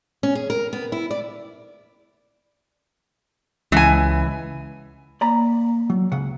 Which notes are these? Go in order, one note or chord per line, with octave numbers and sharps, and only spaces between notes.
C#4
G#4
A#4
B3
E4
D5
C#2 E3 G#5
A#3 D5 A#5 B5
F#3
C#2 C#3 F#5